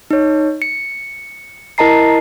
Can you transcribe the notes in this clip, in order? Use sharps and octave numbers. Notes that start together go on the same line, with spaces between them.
D#4 C#5
C#7
E4 A#4 D#5 A5 A#5 C7